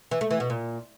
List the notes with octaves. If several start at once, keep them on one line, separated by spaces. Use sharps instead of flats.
E3
A3
E3
B2
A#2